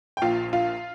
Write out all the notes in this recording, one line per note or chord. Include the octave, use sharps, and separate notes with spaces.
G5
A#1 A#2 F3 F4 F5
F4 F5